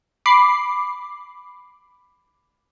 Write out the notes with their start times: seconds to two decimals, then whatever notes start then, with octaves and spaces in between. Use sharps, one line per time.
0.26 B5 D6 C7